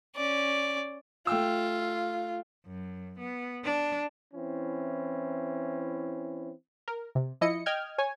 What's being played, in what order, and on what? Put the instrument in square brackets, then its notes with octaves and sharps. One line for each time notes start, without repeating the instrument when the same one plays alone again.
[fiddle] C#4 D5
[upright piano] A3 G5 E6 [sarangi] F4
[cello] F#2
B3
D4
[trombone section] E3 C4 C#4 E4
[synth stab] A#4
C3
F3 E4 D#5 C#7
D#5 G5 F6 G#6
C#5 G#5